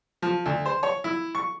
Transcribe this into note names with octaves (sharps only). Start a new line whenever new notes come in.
F3
D2
C5
C#5
E4
C#6